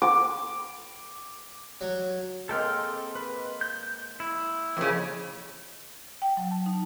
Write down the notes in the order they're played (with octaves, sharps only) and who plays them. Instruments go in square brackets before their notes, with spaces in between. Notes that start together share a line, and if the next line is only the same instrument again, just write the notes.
[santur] D6
[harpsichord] F#3
[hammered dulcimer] G#3 A#3 C4 [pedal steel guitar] A4 G5 F6
[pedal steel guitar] B4
G6
E4
[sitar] F2 C#3 [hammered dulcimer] A#3
[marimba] G5
F#3
A5
D#4